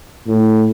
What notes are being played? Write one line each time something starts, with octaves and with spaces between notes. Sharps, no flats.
A2